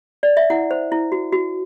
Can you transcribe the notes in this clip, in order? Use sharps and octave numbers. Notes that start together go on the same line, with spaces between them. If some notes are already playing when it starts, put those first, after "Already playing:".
D5
E5
E4 F#5
C5
E4
F#4
F#4